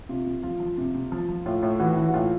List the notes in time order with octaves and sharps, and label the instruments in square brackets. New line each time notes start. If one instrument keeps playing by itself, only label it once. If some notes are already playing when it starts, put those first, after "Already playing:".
[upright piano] C3 F4
C3
F3 F4
F3
C3
C3
F3
F3
A2 F4
A2
E3 F#4
E3
F#4
A2 F4